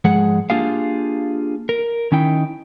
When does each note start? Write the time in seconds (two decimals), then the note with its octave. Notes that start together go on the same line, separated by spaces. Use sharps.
0.05 G#2 F3 G#3 G#4 F#5
0.50 A#3 D4 F4 G4 G#4 F5
1.69 A#4
2.12 D#3 C#4 D#4 E4 G5